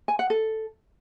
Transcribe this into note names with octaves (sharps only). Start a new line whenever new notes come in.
G#5
F#5
A4